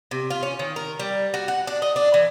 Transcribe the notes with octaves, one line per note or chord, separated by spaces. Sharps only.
C3
F4
C#4
D#3
A#4
G3
F#4
F#5
D4
D#5
D4
E3